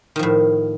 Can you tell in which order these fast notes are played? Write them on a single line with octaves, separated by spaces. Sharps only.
D#3 F3 A2